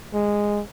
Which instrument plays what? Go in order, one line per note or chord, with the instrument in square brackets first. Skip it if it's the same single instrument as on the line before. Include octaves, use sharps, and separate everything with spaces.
[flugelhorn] G#3